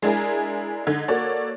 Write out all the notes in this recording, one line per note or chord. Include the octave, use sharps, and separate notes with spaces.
G#3 D4 E4 G#4 A#4
D3 D#4 G#6
A#3 F#4 A4 C#5 D5